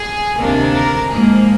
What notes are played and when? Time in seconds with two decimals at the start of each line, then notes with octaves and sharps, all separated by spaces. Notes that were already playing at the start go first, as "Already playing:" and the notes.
Already playing: G#4
0.37 D2 C3 D#3 A#3 D4
0.74 A#4
1.11 G#2 F3 A#3 G#4